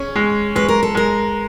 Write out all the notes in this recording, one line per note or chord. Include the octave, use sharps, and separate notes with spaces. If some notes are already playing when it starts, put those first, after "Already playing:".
Already playing: C#4 G#4
G#3
G#3 B4
A#4
A4
G#3 A#4